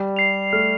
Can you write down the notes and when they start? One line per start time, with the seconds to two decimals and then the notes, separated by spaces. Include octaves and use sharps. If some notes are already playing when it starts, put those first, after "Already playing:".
Already playing: G3
0.16 C7 F7
0.53 A3 F6